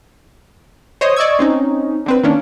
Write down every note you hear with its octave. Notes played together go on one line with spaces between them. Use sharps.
C5 C#5 D#5 D#6
D5 D#5 C#6 E6 G#6
C4 C#4 D#4
D3 C4 B4
D#3 A#3 C#4 D4